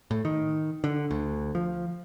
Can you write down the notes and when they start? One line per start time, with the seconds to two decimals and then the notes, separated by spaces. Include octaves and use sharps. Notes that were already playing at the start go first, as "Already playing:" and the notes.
0.11 A2
0.25 D#3
0.84 D3
1.11 D2
1.55 F3